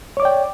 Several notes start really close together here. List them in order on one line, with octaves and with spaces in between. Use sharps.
C#5 D6 D5 G5